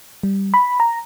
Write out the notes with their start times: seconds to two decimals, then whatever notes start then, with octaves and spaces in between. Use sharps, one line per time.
0.23 G3
0.54 B5
0.80 A#5